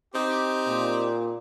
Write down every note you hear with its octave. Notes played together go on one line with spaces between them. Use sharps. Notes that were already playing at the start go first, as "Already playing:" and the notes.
C4 D#4 G4
A#2